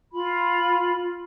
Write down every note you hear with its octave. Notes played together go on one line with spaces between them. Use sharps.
F4 B5